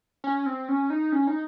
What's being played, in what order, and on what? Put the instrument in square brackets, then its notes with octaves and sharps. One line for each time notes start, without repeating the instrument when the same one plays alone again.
[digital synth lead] C#4
C4
C#4
D#4
C#4
D#4